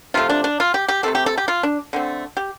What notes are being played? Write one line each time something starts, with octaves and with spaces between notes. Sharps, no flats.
C3 F3 A3 F4
D4
D4
F4
G4
G4
C3 A3 C4 A4
G4
A4
G4
F4
D4
D3 A3 C4
G4